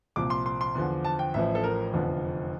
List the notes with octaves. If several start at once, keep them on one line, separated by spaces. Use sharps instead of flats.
C2 A#2 F3 D6
C6
C6
C6
E2 D3 F3
A5
G5
A1 A2 F3 E5
A4
A#4
F1 E2 D3 F3